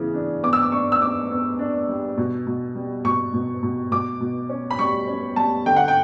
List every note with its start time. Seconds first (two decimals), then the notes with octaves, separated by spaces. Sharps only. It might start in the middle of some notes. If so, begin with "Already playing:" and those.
Already playing: C#3 E3 B3
0.14 D4
0.43 B3 D6
0.53 E6
0.62 D6
0.72 D4 C#6
0.92 E6
1.01 B3 D6
1.31 B3
1.59 D4
1.89 G3
2.18 B2
2.47 B2
2.75 G3
3.05 B2 C#6
3.34 B2
3.63 B2
3.91 B2 D6
4.21 B2
4.49 C#4
4.71 B5
4.79 G3 C#6
5.08 C#4
5.36 G3 A5
5.66 D3 G5
5.76 F#5
5.88 G5